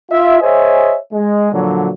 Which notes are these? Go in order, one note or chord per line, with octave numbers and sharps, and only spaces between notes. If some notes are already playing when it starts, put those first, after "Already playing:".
F4 E5
G#4 C5 C#5 D#5 E5 G#5
G#3
A#2 D3 F3 F#3